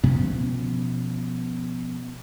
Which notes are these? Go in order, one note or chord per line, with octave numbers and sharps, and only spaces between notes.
B2 F3 B3 C#4